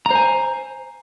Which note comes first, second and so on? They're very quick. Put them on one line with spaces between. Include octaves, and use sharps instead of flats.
A#5 C5 G#5